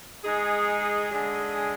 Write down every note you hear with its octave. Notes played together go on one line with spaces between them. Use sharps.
G#3 D#4 G#4
D3 G#3 D4 G#4